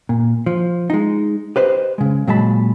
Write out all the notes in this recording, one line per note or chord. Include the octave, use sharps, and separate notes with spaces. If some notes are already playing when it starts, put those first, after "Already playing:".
A#2
F3
G#3 D#4
G4 B4 C5 D#5
C#3 G#3
A#2 F#3 G#3 A5 B5